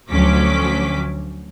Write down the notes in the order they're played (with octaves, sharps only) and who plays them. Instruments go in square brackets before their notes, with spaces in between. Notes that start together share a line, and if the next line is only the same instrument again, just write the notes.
[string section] D2 F3 F#3 C#4 D6 B6